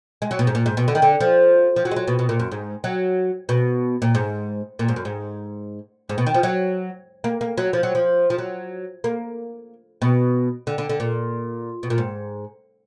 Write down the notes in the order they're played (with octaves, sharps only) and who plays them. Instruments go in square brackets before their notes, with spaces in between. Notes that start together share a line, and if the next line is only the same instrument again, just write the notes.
[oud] G#3
F#3
B2
G#2
A#2
G#2
B2
D3
D#3
D3
F3
F3
F#3
G#3
F#3
B2
B2
A#2
F#2
G#2
F#3
B2
A#2
G#2
A#2
G#2
F#2
G#2
G#2
B2
D#3
F3
F#3
A#3
A#3
F#3
F3
F#3
F3
F3
F#3
A#3
B2
D3
D3
D3
A#2
B2
A#2
G#2